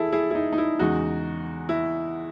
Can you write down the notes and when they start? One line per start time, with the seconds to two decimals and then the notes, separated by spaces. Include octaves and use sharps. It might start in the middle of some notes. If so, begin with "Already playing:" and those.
Already playing: E2 E4 G#4 A4
0.13 E4 G#4
0.31 E4
0.35 D#4
0.52 D#4
0.58 E4
0.79 E2 C#3 G#3 D#4 F#4
1.69 E4